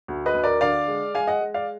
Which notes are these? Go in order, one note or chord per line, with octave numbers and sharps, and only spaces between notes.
D2
B4 D#5
D2
A#4 D5
D3 D5 F5
G#3
G#3 F5 G#5
D#5 F#5
G#3
D5 F5